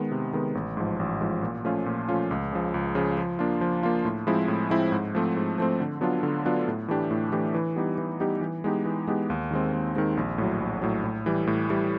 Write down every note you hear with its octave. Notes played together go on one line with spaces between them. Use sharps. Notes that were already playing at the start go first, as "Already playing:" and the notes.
Already playing: D#3 G#3 B3
C3
D#3 G#3 B3
A1
G#2 F3
A1
G#2 F3
A#2
F3 A3 C#4 F4
A#2
F3 A3 C#4 F4
C#2
C#3 F3
C#2
C#3 F3
F3
A#3 D4 F4
F3
A#3 D4 F4
A2
F3 G#3 C4 E4
A2
F3 G#3 C4 E4
G#2
F3 A3 C4
G#2
F3 A3 C4
D3
F#3 B3 D4 F4
D3
F#3 B3 D4 F4
A2
E3 A3 D4 G4
A2
E3 A3 D4 G4
E3
G3 B3 D#4 G4
E3
G3 B3 D#4 G4
E3
G#3 B3 D#4 G4
E3
G#3 B3 D#4 G4
D#2
D#3 G#3 C4
D#2
D#3 G#3 C4
A#1
A2 F#3
A#1
A2 F#3
A2
E3 G3
A2
E3 G3